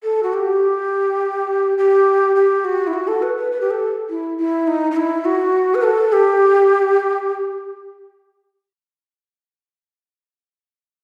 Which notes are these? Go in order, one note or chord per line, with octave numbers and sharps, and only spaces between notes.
A4
F#4
G4
G4
G4
F#4
E4
F#4
A4
B4
B4
B4
G4
A4
E4
E4
D#4
D#4
E4
F#4
B4
A4
G4